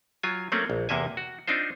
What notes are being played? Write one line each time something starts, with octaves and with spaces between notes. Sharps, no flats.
F#3 F4 G#5
F#3 A3 A#3 C4 C#4
A#1
E2 C3 A#3 E5 G#5
F#4
C4 D4 D#4 F4 C5